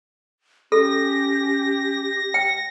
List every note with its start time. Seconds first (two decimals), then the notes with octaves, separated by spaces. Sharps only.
0.72 C#4 G4 A4 A#6
2.34 G5